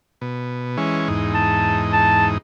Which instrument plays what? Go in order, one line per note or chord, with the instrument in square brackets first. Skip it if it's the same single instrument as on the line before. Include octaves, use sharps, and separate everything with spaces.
[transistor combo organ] B2
E3 G#3 C#4
E2 G#2 D#4
[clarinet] A5
A5